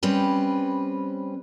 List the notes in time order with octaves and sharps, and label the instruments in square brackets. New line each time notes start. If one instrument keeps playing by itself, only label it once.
[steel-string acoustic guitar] G3 C4 C#4 B4